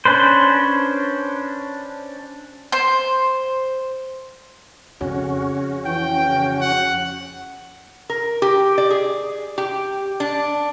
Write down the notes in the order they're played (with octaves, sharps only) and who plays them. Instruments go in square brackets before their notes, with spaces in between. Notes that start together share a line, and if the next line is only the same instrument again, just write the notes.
[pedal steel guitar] C#4 D4 B4 C5
[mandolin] C5
[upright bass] F2 [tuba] C#3 [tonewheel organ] C#4 F#4
[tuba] E3 [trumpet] G5
[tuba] C#3
[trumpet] F#5
[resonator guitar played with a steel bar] A#4
G4
D5
G#4
G4
D4